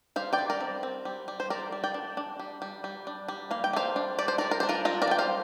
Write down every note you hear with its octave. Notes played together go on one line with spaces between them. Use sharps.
G3 C5 F5
D5 G5
G3
A#4 D5
C4
C4
G3
G3
C5
G3 A#4 D5
G3
D5 G5
D4
D4
G3
G3
G3
D4
G3
A#3 F5
G5
G3 C5 F5
D4
G3 D5
C5
G3 A#4 D5
A#4
D4 C5
F4 A#4
D4 F4 A#4
A#4 D5
G3 G5
C5 F5